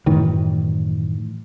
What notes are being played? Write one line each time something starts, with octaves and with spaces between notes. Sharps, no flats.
F#2 A2 D#3 E3